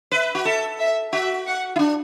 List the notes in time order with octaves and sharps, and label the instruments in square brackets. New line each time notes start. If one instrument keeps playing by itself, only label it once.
[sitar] B4 [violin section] E5
[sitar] F#4
[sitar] A4 [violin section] E5
[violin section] E5
[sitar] F#4 [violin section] E5
[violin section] F#5
[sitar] E4
D4